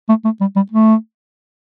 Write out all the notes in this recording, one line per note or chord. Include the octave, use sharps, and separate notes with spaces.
A3
A3
G3
G3
A3